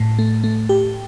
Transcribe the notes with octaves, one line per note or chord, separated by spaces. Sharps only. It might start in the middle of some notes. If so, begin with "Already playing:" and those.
Already playing: A2
A3
A3
G4